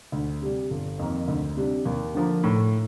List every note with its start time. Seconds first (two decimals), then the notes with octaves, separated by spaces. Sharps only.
0.12 D2
0.42 C3 G3
0.70 G1
0.99 F2 D#3 A#3
1.28 D2
1.57 C3 G3 D4
1.85 D#2
2.15 D3 F3 A#3
2.44 A2